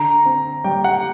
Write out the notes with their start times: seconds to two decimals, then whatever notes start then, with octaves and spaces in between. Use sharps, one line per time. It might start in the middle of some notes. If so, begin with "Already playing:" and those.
Already playing: D3 A#5
0.26 C4
0.64 G3 G5
0.84 F#5